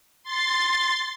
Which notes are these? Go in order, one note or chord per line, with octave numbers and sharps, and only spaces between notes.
C6 A6